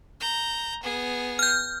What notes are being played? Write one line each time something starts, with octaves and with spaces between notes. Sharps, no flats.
A#5 G6
B3 G#4
F6 G6